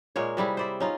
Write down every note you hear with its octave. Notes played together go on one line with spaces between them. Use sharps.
A#2 G#3 A#3 C#5
C3 G3 E4 G#4
C5 D5 E5
C#4 D#4 F4